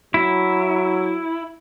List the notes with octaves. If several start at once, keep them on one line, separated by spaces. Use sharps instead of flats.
F#3 E4